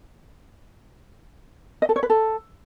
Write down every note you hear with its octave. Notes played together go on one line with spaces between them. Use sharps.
D#5
A4
C#5
B4
A4